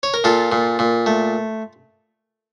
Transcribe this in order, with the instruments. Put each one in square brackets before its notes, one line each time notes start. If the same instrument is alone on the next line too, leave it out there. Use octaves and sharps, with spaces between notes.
[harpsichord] C#5
A#4
A#2 F4 A4
A#2
A#2
A3